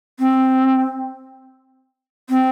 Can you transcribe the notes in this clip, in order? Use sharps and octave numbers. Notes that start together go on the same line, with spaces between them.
C4
C4